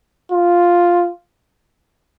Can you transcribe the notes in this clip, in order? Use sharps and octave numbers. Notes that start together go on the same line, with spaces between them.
F4